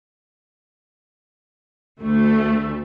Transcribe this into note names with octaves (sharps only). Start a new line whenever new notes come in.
D2 A3